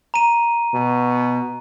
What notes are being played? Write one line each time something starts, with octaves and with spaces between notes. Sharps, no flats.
A#5 D#7
B2